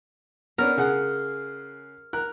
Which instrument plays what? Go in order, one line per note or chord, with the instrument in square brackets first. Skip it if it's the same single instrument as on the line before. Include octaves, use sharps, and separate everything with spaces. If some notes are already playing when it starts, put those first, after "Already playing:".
[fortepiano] B3 C#4 D4 [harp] A#4
[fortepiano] C#3 G#4 F#5
A#4 F#6